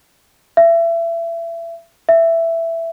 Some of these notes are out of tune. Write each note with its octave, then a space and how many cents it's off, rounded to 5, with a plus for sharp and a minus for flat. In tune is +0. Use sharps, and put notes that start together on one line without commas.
E5 +30
E5 +10